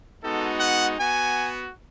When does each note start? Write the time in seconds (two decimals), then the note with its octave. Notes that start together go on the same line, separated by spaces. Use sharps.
0.22 G#3 B3 D#4 F#4 A4
0.60 F#5
0.97 B3 F#4 G#5